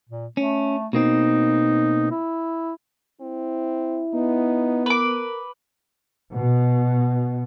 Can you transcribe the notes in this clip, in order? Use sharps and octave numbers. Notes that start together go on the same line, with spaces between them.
A#2
A3 C#4
B2 A#3 C4 D#4
E4
C4 E4
B3 D#4
A#4 B4 D6
B2